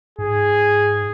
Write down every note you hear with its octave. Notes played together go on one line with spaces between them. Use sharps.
G#2 G#4